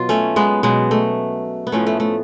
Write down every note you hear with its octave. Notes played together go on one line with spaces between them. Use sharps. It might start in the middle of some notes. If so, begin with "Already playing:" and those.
Already playing: B2 F#3 F4
A3 C#4
G#3 B3
B2 F#3 G#3
A3
B3
A2 F3 A3 C#4
A3
A3